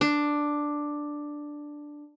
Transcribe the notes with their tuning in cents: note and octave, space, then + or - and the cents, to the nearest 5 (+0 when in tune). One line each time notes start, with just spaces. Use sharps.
D4 +5